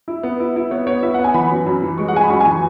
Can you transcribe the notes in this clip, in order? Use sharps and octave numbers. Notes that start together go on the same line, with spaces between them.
E4
B3
E4
E4
B3 C#5
B3 C#5
E4 E5
B3 F#5
G#5
E3 B5
F#2
F#2
E3
G#3 C#6
F#5
G#3 G#5
B5
F#2 C#6
G#5
E3
G#5